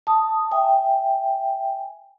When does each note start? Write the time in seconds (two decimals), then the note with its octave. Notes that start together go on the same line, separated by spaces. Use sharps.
0.07 A5 D#6
0.51 E5 G5 G#5